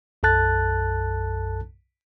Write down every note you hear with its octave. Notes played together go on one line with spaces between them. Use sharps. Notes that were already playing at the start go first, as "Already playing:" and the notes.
B1 F#2 A4 A5 F#6 A6